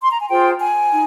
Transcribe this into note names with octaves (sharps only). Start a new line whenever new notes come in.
C6
A#5
G#5
F4 G#4 C5 G5
G#5
D#4